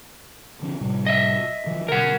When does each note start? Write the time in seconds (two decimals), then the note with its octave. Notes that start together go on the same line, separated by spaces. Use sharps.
0.62 D3 F3 C#4
0.81 A2 C3 G3
1.06 D#5 E5
1.66 D#3 F3 F#3
1.88 B2 D3 A#4 F#5